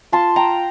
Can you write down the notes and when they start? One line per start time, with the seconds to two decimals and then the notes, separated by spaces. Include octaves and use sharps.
0.12 F4 A5 C6
0.36 G5 A#5